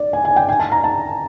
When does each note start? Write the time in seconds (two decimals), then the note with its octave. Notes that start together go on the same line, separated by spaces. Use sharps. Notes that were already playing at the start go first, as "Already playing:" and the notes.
Already playing: D5
0.13 G#5
0.25 G#5
0.36 G5
0.49 G#5
0.60 A5
0.72 A#5
0.84 A5